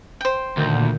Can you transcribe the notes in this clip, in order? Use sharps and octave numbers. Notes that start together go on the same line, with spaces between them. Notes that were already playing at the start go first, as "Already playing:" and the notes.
C5 G5
D2 A#2 D#3 G6